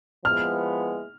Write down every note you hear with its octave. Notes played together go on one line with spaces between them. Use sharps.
F3 G#3 B3 E4 F6